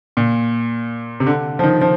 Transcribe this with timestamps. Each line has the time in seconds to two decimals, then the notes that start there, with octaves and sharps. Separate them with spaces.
0.17 A#2
1.20 C3
1.27 D3
1.59 F3
1.63 D#3
1.81 F3